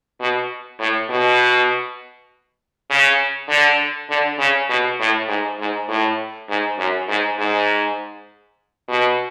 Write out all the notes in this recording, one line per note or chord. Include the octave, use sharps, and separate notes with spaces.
B2
A2
B2
C#3
D3
D3
C#3
B2
A2
G#2
G#2
A2
G#2
F#2
G#2
G#2
B2